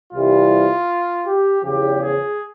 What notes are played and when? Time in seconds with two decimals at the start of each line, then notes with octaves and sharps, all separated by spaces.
0.13 C2 C3 E3 G3 F4
1.25 G4
1.63 E2 C#3 F3 G4
2.01 G#4